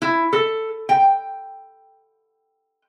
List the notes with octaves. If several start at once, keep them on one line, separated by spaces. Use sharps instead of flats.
E4
A4
G5